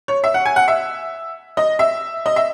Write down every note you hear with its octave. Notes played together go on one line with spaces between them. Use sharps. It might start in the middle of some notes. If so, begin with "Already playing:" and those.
C#5
E5
F#5
G#5
F#5
E5
D#5
E5
D#5
E5